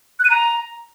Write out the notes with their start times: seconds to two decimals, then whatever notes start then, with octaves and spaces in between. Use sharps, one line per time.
0.19 F#6
0.25 D#7
0.30 A#5